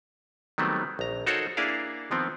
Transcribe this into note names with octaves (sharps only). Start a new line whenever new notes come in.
D#3 F#3 G3 A3 B3 C4
A#1 A#5
D#4 F#4 A4 A#4 C5 C#5
A#3 D4 E4 G#4 D5 F5
D#3 F3 B3 C4